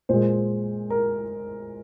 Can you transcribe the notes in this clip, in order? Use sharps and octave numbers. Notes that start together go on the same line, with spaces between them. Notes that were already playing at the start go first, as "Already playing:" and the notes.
A#2 G#3 C5
A#4